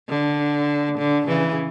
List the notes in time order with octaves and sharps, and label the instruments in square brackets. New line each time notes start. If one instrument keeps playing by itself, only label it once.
[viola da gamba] D3
D3
C#3 E3